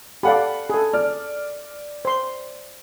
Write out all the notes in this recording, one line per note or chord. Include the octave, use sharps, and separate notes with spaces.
G4 A4 D5 F5 F#5 B5
G#4 A4
D5 F6
C5 C6